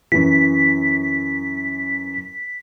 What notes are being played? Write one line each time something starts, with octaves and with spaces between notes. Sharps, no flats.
F#2 E3 B6